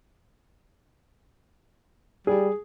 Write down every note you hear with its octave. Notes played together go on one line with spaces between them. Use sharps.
G3 G#4